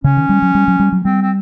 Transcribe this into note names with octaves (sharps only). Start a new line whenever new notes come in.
C#3 C#4
D#3
G3
F#3
G3
F#3
G3
F#3
G3 C4
C4